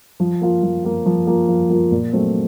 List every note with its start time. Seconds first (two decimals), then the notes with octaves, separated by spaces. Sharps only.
0.20 F3
0.41 A#3 F4
0.63 F3
0.85 A#3 F4
1.06 F3
1.27 A#3 F4
1.48 F3
1.70 A#3 F4
1.92 A#2
2.13 F#3 A3 C4